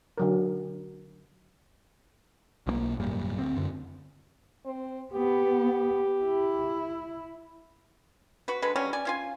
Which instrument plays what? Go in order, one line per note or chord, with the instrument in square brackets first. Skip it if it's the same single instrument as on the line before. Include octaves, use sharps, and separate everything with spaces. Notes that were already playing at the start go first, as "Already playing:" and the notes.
[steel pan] D3 F#3 A#4
[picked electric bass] B1 E3 A#3
G#1 F#2 A#2 G3
D2 C4
F#2 D3
[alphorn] C4
[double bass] B3 [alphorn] G4
[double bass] E4
[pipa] F#4 B4
D3 G#3 B4
C#3 F#3 G3 C#4
D5 G#5
C#4 F4 G#5